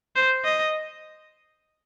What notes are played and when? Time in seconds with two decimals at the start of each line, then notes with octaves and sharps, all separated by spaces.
0.16 C5
0.45 D#5